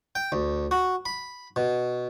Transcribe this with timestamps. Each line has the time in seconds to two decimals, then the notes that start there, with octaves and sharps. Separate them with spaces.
0.15 G5
0.32 D2
0.71 F#4
1.06 B5
1.56 B2